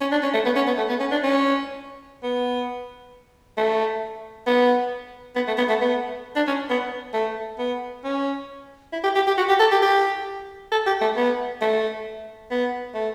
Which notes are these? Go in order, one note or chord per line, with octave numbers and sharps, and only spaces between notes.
C#4
D4
C#4
A3
B3
C#4
B3
A3
B3
C#4
D4
C#4
B3
A3
B3
B3
A3
B3
A3
B3
D4
C#4
B3
A3
B3
C#4
E4
G4
G4
G4
F#4
G4
A4
G4
G4
A4
G4
A3
B3
A3
B3
A3